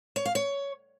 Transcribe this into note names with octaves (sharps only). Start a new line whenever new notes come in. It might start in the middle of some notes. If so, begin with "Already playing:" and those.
C#5
F5
C#5